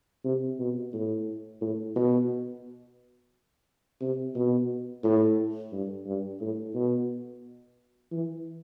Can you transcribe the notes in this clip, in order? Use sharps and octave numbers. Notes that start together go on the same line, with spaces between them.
C3
B2
A2
A2
B2
C3
B2
A2
G2
G2
A2
B2
E3